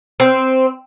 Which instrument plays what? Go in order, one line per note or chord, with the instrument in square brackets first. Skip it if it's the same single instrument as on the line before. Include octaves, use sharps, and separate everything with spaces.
[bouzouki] C4